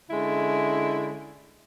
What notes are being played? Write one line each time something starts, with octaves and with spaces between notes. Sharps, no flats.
D3 G#3 C#4 E4